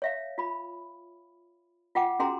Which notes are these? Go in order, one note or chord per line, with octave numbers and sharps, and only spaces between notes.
C#5 E5 F5
F4 B5
F4 F#5 G5 D6
C#4 F#4 G#4 G5 A#5 C6